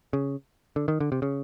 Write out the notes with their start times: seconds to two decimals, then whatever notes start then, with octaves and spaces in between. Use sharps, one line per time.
0.13 C#3
0.76 D3
0.88 D#3
1.00 D3
1.12 C3
1.22 C#3